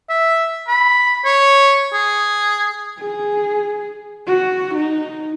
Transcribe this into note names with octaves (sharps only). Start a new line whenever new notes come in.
E5
B5
C#5
G#4
G#4
F#4
D#4